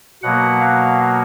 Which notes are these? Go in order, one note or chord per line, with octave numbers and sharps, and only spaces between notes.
B2 F#3 A#3 F#5
F5